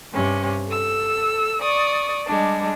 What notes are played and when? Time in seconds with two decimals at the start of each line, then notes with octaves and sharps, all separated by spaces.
0.12 G2 C3 C#4
0.67 A4 E6
1.60 D5 C#6 D#6
2.26 G3 G#3 D4